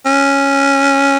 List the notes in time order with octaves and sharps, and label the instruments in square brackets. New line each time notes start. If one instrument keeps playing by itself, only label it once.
[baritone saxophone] C#4